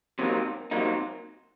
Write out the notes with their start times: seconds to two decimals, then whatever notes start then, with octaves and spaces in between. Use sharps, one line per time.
0.19 C3 F#3 A#3 D#4
0.71 C3 F#3 A#3 D#4